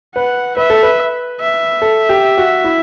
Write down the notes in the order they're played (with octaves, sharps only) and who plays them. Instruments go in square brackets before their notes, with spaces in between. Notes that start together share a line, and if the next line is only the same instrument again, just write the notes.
[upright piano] B4 [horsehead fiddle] F#5
[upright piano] B4 [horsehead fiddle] E5
[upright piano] A4
B4
[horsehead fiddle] E5
[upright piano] A4
G4
F#4
E4